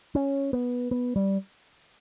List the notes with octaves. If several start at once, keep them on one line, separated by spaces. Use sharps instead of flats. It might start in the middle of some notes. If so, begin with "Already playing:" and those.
C#4
B3
B3
G3